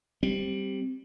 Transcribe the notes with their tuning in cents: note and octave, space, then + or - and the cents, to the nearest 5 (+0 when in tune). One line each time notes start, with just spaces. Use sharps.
G3 +0 C4 +0